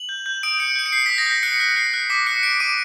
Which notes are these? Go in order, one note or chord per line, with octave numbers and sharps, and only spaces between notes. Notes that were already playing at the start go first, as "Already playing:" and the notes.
Already playing: F#7
G6
G6
D#6 D7
G6 C#7
G6 D7
C#7
G6 C7
D#6 B6
A#6
G6 B6
F#6 C#7
F#6 C#7
F#6 C7
F#6
D6 B6
F#6 C#7
F#6 D7
D6 D#7